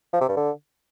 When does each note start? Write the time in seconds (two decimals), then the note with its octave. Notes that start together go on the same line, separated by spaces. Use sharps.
0.13 F3
0.21 C3
0.29 G2
0.37 D3